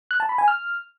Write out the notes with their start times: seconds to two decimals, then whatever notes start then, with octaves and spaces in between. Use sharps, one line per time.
0.11 F#6
0.20 A5
0.29 B5
0.38 G#5
0.48 F6